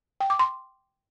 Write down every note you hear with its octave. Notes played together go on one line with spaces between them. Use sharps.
G5
D6
C6